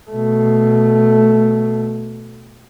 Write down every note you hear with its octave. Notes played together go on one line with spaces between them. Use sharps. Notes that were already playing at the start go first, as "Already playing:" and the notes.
B2 A3